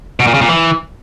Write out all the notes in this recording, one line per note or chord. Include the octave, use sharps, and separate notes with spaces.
B2
A#2
C#3
A#2
E3